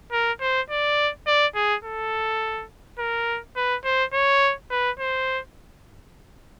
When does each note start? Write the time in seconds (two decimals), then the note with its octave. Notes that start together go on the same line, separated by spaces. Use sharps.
0.12 A#4
0.41 C5
0.70 D5
1.27 D5
1.55 G#4
1.85 A4
2.99 A#4
3.56 B4
3.85 C5
4.13 C#5
4.71 B4
5.00 C5